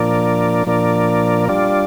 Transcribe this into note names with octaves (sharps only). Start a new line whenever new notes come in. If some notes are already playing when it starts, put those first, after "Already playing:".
Already playing: A#2 F3 D4 A#4 D5
A#2 F3 D4 A#4 D5
G3 D4 F4 D5